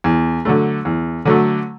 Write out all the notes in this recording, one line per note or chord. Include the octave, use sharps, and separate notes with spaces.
E2
D3 F#3 A3
E2
D3 F#3 A3